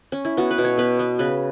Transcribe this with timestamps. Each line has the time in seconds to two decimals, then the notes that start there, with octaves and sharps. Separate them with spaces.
0.12 C#4
0.25 E4
0.37 B3 F#4
0.51 B4
0.58 B2
0.64 C#5
0.78 B3 B4
0.99 B3
1.19 C#3 B4